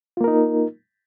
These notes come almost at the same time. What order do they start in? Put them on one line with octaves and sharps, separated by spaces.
F4 A#3 A#4 D#4